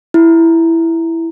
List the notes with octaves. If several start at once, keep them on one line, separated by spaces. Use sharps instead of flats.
E4